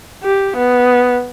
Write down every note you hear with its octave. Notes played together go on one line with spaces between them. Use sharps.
G4
B3